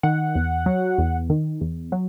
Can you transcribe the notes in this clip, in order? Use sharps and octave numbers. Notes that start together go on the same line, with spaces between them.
D#3 F#5
E2
F#3
E2
D#3
E2
F#3